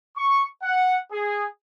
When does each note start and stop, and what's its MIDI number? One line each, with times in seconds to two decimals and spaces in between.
0.15 0.44 85
0.62 0.98 78
1.12 1.44 68